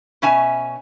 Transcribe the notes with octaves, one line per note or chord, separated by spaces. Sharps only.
B2 C#4 E5 G#5